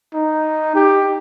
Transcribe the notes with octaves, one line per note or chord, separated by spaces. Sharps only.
D#4
G4